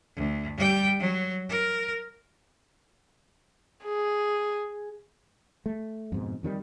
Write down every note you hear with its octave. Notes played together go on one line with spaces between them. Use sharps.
D2
G3 G5
F#3
A#4
G#4
A3
F2 G#2 B2
F2 D#3 F#3 G3